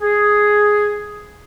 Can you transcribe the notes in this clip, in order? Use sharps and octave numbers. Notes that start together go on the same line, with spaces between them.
G#4